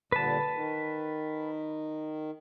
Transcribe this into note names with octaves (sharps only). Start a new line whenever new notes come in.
A#2 D3 G3 B4 A5
D#3